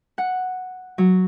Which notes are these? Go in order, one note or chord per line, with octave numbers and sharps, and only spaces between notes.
F#5
F#3